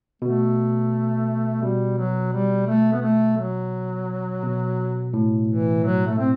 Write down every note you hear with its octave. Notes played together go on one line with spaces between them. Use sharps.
B2 A3
B2 G3
F#3
G3
A3
B3
A3
F#3
B2
A2
E3
F#3
A3
C4